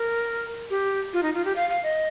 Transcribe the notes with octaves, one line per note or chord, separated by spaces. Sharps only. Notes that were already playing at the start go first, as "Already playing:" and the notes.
Already playing: A#4
G4
F4
D#4
F4
G4
F5
F5
D#5